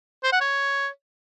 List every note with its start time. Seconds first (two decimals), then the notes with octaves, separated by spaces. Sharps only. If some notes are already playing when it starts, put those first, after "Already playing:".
0.24 C5
0.32 F#5
0.41 C#5